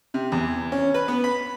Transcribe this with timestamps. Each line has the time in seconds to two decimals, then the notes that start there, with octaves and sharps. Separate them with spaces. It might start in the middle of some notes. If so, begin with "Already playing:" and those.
0.14 C3
0.32 E2
0.72 C#4
0.94 B4
1.08 B3
1.24 B5